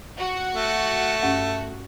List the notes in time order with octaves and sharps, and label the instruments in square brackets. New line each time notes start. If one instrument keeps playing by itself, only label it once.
[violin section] F#4
[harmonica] A3
[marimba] G2 C#4 F#5